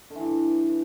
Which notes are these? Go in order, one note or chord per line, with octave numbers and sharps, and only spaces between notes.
D3
E3
G2